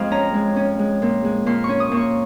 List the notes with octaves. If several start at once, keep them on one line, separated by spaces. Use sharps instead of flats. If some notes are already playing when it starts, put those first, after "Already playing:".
Already playing: F2 G#3 D#5 F5
C#4 A#5
G#3
C#4
G#3
A#2
G#3
A#2 C6
C#6
C#4
D#6
A#2
C#6